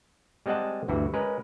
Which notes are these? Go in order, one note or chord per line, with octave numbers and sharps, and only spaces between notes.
G3 G#3 C4 D#5 F#5 A5
D2 G2 E3 F#4
G#3 C#4 A#4 B4